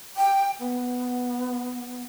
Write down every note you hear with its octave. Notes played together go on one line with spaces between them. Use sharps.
G5
B3